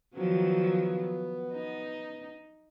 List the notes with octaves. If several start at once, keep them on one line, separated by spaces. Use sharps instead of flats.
D#3 F3 F#3 B3
D#4